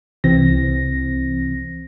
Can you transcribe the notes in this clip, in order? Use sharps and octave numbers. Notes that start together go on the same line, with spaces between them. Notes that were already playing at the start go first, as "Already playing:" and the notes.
C2 C3 E3 C4 A#6